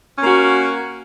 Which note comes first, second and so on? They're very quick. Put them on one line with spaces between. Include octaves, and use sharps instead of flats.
C#4 A#3 F#4